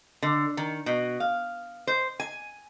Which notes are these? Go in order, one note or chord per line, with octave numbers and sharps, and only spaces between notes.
D3
D#3
B2
F5
C5
G#5